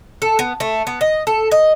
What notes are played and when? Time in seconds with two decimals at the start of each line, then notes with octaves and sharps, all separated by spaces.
0.22 A4
0.39 B3
0.60 A3
0.87 B3
1.01 D#5
1.27 A4
1.51 D#5